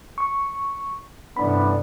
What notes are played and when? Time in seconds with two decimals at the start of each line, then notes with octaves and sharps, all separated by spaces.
0.18 C#6
1.36 A1 G2 C3 G3 B3 D4 B5